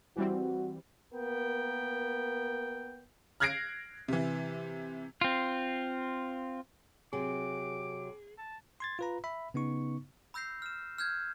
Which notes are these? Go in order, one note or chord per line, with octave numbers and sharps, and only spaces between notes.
E3 G3 C4 F#4
A#3 B3 A#4 G5
F6 F#6 G#6 A#6 C7 D7
C3 E3
C4 F4
C3 F#3 G#4 D6
A5
C6 G#6 A6
F4 B4 A#5
E5 B5
C#3 B3 D#4 C#6
B5 E6 G6 A#6 C7
F6 E7
F6 G6 G#6